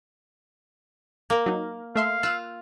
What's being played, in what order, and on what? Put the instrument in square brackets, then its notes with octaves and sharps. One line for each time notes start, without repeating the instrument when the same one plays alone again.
[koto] A#3 A#4
[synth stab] F#3 D#4
[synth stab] A3 E5 C6 [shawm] F5
[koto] F4 [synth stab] E6 F#6